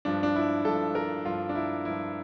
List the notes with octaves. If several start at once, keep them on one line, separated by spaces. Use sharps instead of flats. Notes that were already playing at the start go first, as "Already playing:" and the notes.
G2 F3 D4
D4
E4
G2 F3 A4
A#4
G2 F3 F4
D4
E4
G2 F3 E4